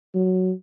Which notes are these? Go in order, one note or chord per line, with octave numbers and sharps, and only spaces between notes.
F#3